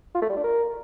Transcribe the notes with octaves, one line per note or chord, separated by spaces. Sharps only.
F4
A3
G3
D4
A#4